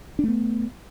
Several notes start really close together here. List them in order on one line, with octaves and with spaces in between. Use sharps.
D4 A3 B3